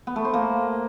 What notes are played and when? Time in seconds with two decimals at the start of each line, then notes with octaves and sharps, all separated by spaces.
0.07 B3
0.16 A3
0.25 C5
0.34 A#3